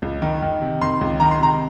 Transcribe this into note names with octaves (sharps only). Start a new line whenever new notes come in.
C#2
D#3
D#3
C3
D#3 C6
C#2
D#3 A#5
C6
C3 A#5